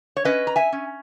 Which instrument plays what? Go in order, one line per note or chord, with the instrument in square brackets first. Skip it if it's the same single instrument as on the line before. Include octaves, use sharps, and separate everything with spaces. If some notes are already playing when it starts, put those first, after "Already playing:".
[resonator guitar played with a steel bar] C#5
C#4 B4 D#5
A#5
E5 G#5
C#4